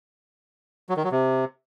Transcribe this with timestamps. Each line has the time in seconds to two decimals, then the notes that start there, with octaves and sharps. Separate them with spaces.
0.89 F#3
0.97 D#3
1.04 F#3
1.12 C3